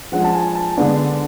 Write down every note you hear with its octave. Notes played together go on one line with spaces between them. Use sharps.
F3 G#3 D4 F#5
A5
G#5
A5
D3 G#3 B3 D4